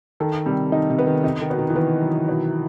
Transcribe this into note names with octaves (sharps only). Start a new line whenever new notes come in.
D#3 A4
C3 G3
D#3 D#4
C3
B3
D#3
C3 D#4
D#3
B2
D#3
E3
D#3 B3
F#3
B2